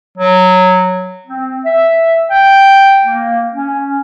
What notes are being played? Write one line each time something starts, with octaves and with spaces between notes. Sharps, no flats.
F#3
C4
E5
G5
A#3
C#4